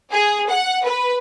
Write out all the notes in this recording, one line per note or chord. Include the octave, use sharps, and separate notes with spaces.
G#4
F#5
B4